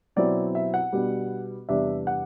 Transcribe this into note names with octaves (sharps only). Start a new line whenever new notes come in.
B2 F#3 C4 E4 D5
E5
F#5
B2 G3 B3 D4
E2 C3 G3 D4 E5
F#5